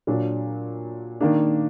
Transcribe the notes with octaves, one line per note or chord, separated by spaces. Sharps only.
A#2 F#3 D4
D#3 A#3 D4